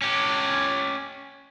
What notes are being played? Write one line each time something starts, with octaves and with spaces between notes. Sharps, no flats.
C#4 G4